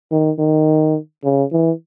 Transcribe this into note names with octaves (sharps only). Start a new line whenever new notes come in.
D#3
D#3
C#3
E3